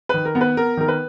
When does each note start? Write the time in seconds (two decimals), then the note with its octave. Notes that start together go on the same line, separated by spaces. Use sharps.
0.09 D#3 B4
0.25 A#4
0.35 B3
0.41 B4
0.57 B3 A#4
0.77 D#3 A#4
0.88 B4